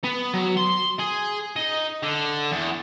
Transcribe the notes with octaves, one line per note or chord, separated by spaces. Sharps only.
B3
F#3
C6
G#4
D#4
D3
E2